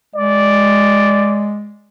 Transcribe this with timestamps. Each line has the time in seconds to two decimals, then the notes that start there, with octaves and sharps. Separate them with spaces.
0.15 G#3 D5